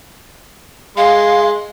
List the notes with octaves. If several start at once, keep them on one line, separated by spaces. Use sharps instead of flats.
G#3 F5 C6